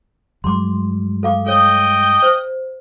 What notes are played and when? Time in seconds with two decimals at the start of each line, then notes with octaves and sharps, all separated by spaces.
0.44 G2 F#3 G#3 C6 D6
1.23 A4 F5 D6
1.46 A4 C#5 D#5 G5
2.23 C5